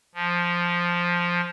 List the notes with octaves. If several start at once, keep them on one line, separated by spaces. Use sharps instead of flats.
F3